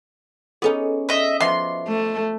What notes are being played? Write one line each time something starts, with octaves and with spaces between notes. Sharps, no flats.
B3 C#4 D#4 G#4 A4
D#5 E5
F3 B3 F#4 D#5 E5 C6 D6
A3